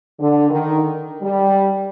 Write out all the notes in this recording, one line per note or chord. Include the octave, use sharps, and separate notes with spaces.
D3
D#3
G3